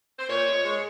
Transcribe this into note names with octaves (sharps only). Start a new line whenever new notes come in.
C5
A#2 C#5
G#3
G#3